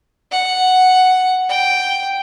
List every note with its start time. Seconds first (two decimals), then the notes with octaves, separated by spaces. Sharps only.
0.32 F#5
1.49 G5